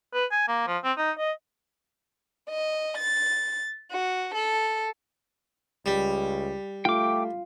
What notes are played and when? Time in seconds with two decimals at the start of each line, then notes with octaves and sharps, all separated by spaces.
0.14 B4
0.32 G#5
0.48 A#3
0.67 F3
0.84 C4
0.98 D#4
1.18 D#5
2.50 D#5
2.97 A6
3.90 F#4
4.34 A4
5.86 C#2 G3
6.85 A3 F4 G5 D6